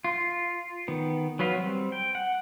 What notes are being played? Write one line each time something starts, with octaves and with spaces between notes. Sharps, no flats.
F4
D#3 B3
F#3 B3 B4 F5
G3 C4
G5
F#5